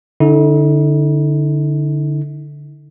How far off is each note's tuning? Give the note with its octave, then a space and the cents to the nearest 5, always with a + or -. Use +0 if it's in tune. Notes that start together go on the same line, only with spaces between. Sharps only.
D3 +0 E4 -45